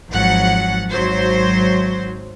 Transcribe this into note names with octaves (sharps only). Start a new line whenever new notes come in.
G#1 F3 F#3 F#5
G#1 F#3 C5